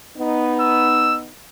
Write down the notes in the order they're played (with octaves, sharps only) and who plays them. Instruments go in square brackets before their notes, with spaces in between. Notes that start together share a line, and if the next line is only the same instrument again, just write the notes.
[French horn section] B3 D#4
[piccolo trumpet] E6